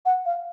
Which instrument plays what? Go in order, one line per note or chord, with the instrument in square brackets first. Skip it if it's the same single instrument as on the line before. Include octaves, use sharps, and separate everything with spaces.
[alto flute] F#5
F5